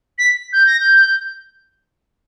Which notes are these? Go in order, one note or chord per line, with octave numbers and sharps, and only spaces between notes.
B6
G6
A#6
G6